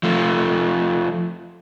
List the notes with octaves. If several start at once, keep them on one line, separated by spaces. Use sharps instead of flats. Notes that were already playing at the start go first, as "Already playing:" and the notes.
F3 A3